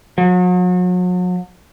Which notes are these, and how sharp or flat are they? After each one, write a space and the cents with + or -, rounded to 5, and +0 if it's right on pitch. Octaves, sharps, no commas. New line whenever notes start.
F#3 -40